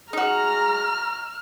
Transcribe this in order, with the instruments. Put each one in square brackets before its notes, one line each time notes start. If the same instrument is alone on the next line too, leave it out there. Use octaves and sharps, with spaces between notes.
[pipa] D#4 F#4 [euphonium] G#4 [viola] A#5 [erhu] F6